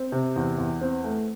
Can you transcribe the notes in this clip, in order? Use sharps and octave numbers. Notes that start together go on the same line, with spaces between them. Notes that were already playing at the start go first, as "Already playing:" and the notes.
Already playing: C4
C3
E2
E2
C4
A3